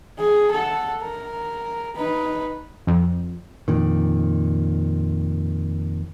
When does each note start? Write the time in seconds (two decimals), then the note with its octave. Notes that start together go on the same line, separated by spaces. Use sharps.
0.19 G#4
0.51 A4 F#5
1.02 A#4
1.97 D#4 B4
2.87 F2
3.68 F2 A#2 D#3